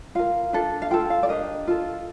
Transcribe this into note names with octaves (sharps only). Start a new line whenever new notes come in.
F4 A#4 F5
D4 F4 A4
F5
F4 A4 G5
F5
D5
D4 G4 A#4 D#5
F4 A4